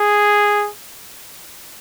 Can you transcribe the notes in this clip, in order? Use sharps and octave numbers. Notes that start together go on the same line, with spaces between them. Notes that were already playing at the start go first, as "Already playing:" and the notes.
Already playing: G#4